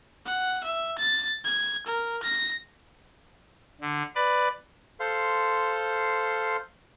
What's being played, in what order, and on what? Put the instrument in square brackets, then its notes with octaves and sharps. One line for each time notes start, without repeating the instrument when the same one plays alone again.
[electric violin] F#5
E5
A6
G#6
A#4
A#6
[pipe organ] D3
B4 D5 B5
[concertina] A4 C5 F5 C6